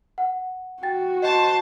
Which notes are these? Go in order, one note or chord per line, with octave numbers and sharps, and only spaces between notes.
F#5
F#4 G5 A6
C5 D#5 A5